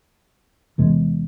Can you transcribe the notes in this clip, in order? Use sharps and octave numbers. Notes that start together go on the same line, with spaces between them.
E2 C3 E3 G#3